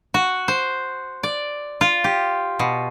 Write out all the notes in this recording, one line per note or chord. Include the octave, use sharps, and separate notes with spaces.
F#4
C5
D5
F4
G4
B2